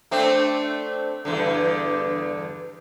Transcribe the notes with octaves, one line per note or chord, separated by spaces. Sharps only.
A3 C4 D4
E2 G2 D3